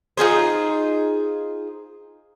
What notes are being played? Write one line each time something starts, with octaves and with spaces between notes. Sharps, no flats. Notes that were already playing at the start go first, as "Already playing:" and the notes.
D#4 F4 G#4 C5